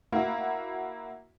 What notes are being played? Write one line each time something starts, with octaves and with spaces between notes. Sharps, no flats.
A#3 E4 F#4